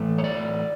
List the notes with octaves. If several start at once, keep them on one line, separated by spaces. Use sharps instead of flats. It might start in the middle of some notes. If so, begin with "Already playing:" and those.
Already playing: A2 E3 A3
C#5
D5